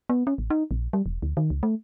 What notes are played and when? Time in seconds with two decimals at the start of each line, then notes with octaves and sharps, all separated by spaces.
0.09 B3
0.27 C#4
0.38 A1
0.50 D#4
0.71 A#1
0.93 G3
1.06 E1
1.22 D2
1.37 D#3
1.50 C#2
1.63 A3